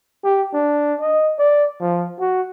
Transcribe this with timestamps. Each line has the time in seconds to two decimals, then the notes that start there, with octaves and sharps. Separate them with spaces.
0.24 G4
0.54 D4
1.00 D#5
1.39 D5
1.80 F3
2.20 F#4